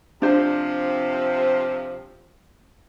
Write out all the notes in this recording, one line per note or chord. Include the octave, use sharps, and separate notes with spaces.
C3 F3 D4 C5